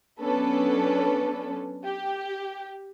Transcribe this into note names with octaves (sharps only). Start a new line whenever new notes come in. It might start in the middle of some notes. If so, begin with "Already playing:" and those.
F#3 B3 C#4 D4 A4 B4
G4